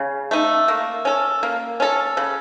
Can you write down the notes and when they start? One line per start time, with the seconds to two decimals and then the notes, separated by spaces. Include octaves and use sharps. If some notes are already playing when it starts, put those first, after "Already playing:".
Already playing: C#3
0.31 A3 D#4
0.68 A#3
1.05 C#4 A4
1.43 A#3
1.80 C#4 A4
2.17 C#3